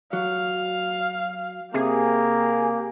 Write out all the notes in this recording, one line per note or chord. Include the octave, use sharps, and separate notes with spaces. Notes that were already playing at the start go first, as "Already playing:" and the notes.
F#3 F5
C3 A#3 G4 G#4